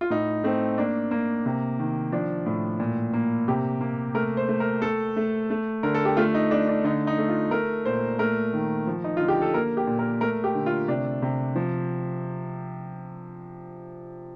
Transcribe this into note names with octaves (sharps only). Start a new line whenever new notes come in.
F4
A2 D#4
A3 C4
A#3 D4
A#3
C3
D#3
F3 D4
A2
A#2
A#3
C3 G4
A#3
A3 A#4
C5
A3
A#4
A3 A4
A3
A3
D3 A#4
A4
G4
A3 F4
D#4
A3 D4
D4
D3 D#4
D#4
A3
F4
A3 A#4
A#2 C5
A3 A#4
D#3
F3
D#4
D3 F4
G4
A4
A#3 A#4
G4
A#2
A#4
A3 A#4
G4
D3
F4
C3 D4
C3
F3